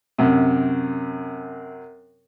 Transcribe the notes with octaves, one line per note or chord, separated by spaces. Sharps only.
F#2 C3